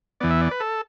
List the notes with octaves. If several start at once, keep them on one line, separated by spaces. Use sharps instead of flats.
E2 E3 B3 D5
E5
D5
B4
A4